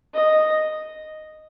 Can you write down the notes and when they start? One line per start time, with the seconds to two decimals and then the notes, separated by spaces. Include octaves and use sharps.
0.14 D#5